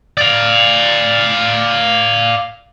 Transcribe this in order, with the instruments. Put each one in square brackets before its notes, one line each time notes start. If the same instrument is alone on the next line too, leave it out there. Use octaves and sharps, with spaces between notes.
[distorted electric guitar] D5 F5